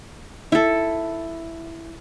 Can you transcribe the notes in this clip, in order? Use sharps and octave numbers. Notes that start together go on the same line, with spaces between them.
E4 A4